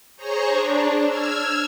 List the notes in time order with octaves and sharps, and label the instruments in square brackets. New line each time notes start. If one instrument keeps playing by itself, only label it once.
[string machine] G#4 C5 C#5 A#5 C#6
D4
E6 F6 G#6